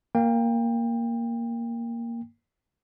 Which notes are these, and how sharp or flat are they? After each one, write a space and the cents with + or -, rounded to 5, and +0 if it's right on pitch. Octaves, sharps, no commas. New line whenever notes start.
A#3 +0 G5 +25